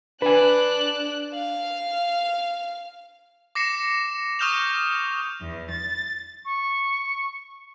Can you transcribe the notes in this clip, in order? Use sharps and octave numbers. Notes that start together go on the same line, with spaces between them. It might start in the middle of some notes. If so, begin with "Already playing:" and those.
D4 B4 G#5 F#6
F5
D6 A#6 C7 C#7 E7
C#6 D#6 F6 G6 E7 F7
E2
A6
C#6